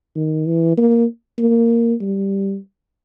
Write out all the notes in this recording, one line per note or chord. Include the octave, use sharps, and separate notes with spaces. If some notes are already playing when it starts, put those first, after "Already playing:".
D#3
E3
A#3
A#3
G3